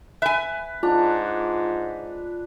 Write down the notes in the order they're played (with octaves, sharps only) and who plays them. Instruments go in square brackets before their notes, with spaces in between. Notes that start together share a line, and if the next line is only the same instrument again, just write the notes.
[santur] B4 [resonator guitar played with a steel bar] E5 G#5
[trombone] G#2 [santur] D4 [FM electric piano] F4